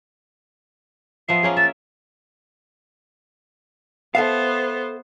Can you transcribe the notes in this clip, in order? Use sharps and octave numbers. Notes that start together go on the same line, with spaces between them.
F3 B3 E5 C7
A#3 C#4 G#4
E5 A6
B3 A4 C5 E5 F5